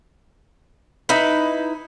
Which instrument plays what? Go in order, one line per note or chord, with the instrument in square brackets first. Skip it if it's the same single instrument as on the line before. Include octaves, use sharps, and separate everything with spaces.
[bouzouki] D#4 E4 B4